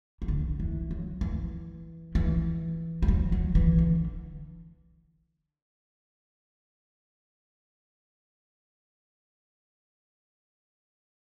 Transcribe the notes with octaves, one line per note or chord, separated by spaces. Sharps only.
E3
D3
E3
F#3
E3
E3
G3
F#3
F#3
E3
D3